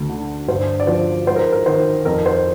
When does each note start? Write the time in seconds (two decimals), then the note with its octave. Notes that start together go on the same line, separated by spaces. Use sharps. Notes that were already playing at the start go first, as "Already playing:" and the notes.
Already playing: D2
0.09 D3
0.48 G2 C5
0.80 D5
0.87 F3 C5
1.27 G#2 C5
1.36 A#4
1.52 A#4
1.66 D#3 C5
2.05 F2 A#4
2.26 C5